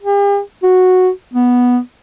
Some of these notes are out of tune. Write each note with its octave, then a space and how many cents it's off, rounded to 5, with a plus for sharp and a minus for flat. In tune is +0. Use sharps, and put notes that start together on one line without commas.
G4 +45
F#4 -5
B3 -5